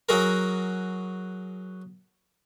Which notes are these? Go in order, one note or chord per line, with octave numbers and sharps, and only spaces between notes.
F#3 F#4 G#4 A#4